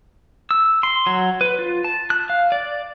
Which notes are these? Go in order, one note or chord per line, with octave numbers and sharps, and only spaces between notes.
E6
C6
F#3
B4
F4
A5
F#6
F5
D5